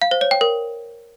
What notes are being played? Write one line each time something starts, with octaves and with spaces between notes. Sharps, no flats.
F5
C5
C#5
G5
A#4